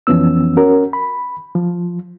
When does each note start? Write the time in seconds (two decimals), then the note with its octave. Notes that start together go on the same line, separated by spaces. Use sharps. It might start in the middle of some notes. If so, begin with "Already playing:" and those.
0.07 F2 E3 F3 B3 C#4 E6
0.57 C#4 F#4 A#4
0.93 B5
1.55 F3